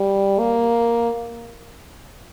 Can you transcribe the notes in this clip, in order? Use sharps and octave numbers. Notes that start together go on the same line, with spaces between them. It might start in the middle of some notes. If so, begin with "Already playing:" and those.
Already playing: G3
A#3